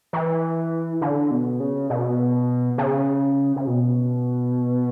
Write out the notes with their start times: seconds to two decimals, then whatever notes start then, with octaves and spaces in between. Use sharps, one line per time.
0.13 E3
1.02 D3
1.31 B2
1.60 C#3
1.90 B2
2.78 C#3
3.56 C#3
3.67 B2